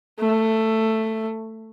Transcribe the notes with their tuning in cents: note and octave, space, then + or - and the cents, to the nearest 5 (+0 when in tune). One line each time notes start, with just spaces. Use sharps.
A3 +10